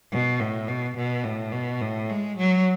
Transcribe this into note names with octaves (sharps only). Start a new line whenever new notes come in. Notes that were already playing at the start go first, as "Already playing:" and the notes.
B2
A2
B2
B2
A2
B2
A2
G#3
F#3